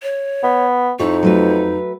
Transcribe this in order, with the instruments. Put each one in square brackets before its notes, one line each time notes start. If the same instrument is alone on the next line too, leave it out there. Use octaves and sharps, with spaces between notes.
[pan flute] C#5
[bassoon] B3
[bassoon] F2 [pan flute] D#4 [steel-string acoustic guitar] E4 C#5
[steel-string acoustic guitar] F#3 A3 B4